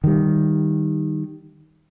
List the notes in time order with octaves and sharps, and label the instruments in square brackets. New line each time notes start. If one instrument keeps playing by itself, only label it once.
[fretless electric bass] D#3 G3